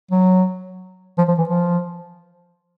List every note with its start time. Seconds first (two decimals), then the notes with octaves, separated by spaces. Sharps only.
0.11 F#3
1.18 F3
1.28 F3
1.38 E3
1.49 F3